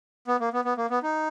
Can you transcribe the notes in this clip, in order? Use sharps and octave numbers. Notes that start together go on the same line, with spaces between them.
B3
A#3
B3
B3
A#3
B3
D#4